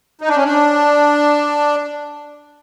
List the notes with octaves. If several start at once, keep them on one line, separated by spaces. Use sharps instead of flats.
D#4
D4
C#4
D4